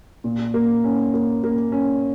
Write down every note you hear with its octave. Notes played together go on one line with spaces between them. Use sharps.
A#2
A#3
C#4
A#3
A#3
C#4